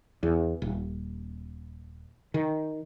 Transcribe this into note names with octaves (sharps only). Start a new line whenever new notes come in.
E2
D#1
D#3